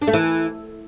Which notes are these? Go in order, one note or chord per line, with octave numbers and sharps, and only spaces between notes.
D4
A3
E3